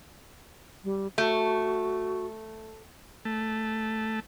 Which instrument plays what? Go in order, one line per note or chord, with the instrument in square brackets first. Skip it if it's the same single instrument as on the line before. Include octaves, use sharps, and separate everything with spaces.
[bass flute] G3
[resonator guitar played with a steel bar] A3 [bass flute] F#4
[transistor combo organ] A3